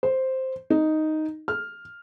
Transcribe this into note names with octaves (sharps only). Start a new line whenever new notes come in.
C5
D#4
F6